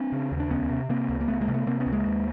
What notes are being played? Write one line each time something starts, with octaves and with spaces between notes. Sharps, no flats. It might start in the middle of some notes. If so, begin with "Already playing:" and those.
Already playing: C4 D4
C#3
D#2
D4
C#2 B3 C#4
C3
C3 A#3 C4
C#2
A#3
C#2 A3 B3
G#3 A#3
C3
A3 B3
C3 A#3 C4
B3 C#4
C#2
G#3 A#3
D#2